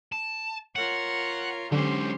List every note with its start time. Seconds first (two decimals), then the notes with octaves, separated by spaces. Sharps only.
0.12 A5
0.76 F4 A#4 C#5 F#5
1.72 D3 F#3 G#3 C#4 G4 C5